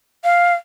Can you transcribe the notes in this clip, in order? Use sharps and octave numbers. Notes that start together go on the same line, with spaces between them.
F5